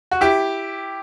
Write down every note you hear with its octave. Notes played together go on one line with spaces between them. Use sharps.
F#4
E4 G4